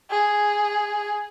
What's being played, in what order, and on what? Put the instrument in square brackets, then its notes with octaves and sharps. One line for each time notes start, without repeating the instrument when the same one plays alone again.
[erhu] G#4